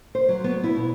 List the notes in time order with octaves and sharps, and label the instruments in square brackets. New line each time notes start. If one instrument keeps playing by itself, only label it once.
[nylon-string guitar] C5
F#3
B3
E4
B2